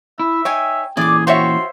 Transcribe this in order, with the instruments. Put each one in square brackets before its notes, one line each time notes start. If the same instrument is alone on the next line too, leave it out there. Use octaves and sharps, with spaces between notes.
[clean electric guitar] E4 [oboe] E5
[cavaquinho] D#4 G#5 [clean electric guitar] C#5 [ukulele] G5
[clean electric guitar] A#2 E3 C#4 [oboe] G#4 [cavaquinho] D5 D6
[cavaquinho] F4 F#4 G5 [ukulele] C5 C#5 E5 [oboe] C6